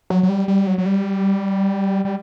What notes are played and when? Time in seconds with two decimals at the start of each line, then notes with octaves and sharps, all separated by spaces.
0.10 F#3
0.23 F#3
0.29 G3
0.48 G3
0.67 F#3
0.78 F#3
0.86 G3
2.05 G3